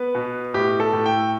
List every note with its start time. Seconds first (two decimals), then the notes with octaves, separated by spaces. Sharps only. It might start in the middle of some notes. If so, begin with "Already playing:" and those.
Already playing: B3 B4
0.15 B2
0.54 A2 G4
0.80 A4
0.93 A2
1.06 G5